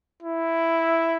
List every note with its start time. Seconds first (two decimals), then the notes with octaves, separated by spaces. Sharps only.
0.22 E4